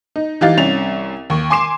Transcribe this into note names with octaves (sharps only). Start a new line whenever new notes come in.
D#4
E3 D#4 G4 F5 A6
C2 C#4 F7
D#2 C#6
G#5 C6 D6 C7 E7